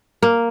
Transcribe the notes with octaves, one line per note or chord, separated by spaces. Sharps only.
A#3